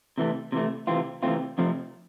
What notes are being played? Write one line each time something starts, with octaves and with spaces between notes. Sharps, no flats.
C3 E3 A3
C3 E3 A3
C3 E3 A3 C4 F4
C3 E3 A3 C4 F4
F2 C3 F3 A3